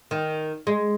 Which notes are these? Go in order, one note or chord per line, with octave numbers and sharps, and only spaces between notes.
D#3
G#3